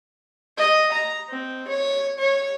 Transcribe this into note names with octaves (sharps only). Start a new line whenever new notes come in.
D#5
A#5
C4
C#5
C#5